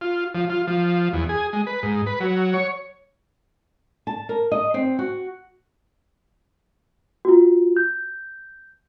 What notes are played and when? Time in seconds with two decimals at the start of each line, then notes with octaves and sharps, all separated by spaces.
0.01 F4
0.35 F3
0.50 F4
0.67 F3
1.13 E2
1.29 G#4
1.53 G#3
1.67 B4
1.83 G#2
2.07 B4
2.20 F#3
2.54 C#5
4.07 A5
4.29 A#4
4.52 D#5
4.74 C4
4.99 F#4
7.25 F4 F#4
7.77 G6